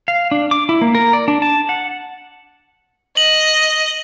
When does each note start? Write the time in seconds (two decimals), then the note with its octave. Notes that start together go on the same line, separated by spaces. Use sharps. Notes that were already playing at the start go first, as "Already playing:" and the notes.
0.08 F5
0.31 D4
0.51 D6
0.69 E4
0.82 A#3
0.95 A#4
1.13 D5
1.28 D4
1.42 A5
1.69 F#5
3.17 D#5 F#7